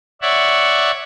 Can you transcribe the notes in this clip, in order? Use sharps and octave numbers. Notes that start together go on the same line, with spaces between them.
C#5 D5 E5 F#5